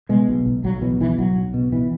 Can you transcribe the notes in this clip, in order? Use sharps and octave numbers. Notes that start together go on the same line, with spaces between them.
B2 G#3
B1
B1
B1 F#3
B2 E3
B1 E3
B1 F#3
B1
B2
B2 E3